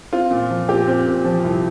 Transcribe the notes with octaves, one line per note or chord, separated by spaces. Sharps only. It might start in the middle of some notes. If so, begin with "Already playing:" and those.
C4 F4
A#2
F3
A#2 G4
C4
A#2
F3
C2